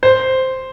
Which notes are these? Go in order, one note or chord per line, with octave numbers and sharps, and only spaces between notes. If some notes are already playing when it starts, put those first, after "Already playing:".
C5